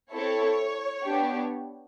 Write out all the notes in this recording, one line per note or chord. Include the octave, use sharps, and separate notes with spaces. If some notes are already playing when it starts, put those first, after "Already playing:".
C4 E4 A4 C#5
B3 D4 G4